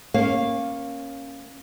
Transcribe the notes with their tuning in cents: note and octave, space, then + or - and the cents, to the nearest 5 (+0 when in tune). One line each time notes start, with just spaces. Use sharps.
A#3 +5 C#4 -15 F5 +0